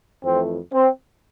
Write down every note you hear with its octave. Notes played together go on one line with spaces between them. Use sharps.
F2 E3 A3 C4
C4